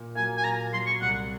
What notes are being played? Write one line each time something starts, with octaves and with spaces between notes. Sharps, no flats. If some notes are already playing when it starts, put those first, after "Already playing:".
Already playing: A#2
F#3 A#3 G#5
G#5
A#2 A#5
F#3 A#3 C6
C#6
C2 F#5